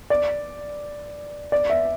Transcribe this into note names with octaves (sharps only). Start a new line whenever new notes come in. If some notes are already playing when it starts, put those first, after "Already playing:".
D5
D5
E5